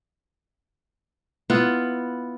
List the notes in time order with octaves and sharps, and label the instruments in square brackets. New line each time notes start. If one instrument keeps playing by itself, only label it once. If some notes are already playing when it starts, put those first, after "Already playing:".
[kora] B3 E4 F4